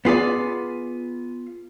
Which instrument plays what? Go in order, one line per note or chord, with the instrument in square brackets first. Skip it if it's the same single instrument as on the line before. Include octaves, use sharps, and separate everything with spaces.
[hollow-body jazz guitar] B3 F4 G#4 D5